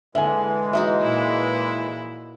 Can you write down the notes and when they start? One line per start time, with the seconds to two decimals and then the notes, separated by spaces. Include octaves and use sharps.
0.15 D3 E3 G#3 E5 G#5
0.73 F#3 D#4 F#4 E5
1.03 A#2 E4